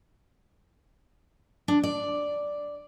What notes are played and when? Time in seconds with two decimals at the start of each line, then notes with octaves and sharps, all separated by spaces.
1.68 D4
1.83 D5